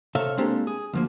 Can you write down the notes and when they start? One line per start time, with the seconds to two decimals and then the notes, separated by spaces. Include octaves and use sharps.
0.15 C3 A4 C#5 E5 F5
0.37 G#3 A#3 C4 D4 G4 A4
0.67 G#4
0.93 D2 F3 A#3